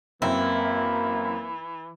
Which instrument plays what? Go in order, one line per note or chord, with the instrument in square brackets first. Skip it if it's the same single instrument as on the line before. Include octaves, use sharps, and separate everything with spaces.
[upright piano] F#2 C4 [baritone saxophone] E3 [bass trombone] A#3 [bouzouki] E4